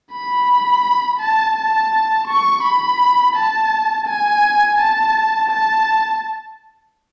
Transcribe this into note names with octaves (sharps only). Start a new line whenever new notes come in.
B5
A5
A5
C#6
B5
A5
G#5
A5
A5